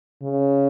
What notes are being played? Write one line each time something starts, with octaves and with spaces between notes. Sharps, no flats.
C#3